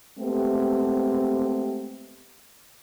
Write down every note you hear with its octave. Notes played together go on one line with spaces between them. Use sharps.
G#3 A3 B3 C4 G4